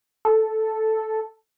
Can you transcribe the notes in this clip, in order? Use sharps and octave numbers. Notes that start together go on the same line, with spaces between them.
A4